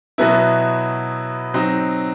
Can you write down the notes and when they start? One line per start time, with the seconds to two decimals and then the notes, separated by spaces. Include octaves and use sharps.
0.18 B2 F#3 B3 E4
1.54 F#3 C4 D#4